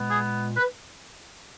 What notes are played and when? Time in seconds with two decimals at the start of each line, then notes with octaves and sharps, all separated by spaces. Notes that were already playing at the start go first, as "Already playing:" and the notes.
Already playing: A#2 G#3 B3
0.11 G#4
0.57 B4